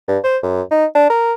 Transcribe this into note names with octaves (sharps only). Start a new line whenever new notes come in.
G2
C5
F#2
D#4
D4
A#4